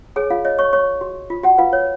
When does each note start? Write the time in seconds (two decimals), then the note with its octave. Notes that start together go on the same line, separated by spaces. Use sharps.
0.16 G#4 C#5 G#5
0.30 F4 F5
0.45 C#5 D#5
0.59 C#5 C#6
0.73 C#5 C#6
1.01 F#4
1.30 F4
1.43 F#4 F#5
1.58 F4 B4 F5
1.73 C#5